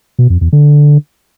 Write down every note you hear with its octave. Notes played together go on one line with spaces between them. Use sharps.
B2
F2
E2
D3